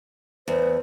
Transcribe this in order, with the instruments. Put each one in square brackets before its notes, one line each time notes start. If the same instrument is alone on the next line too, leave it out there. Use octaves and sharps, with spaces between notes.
[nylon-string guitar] E2 [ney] C5